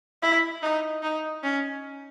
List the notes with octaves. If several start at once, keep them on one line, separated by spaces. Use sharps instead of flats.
E4
D#4
D#4
C#4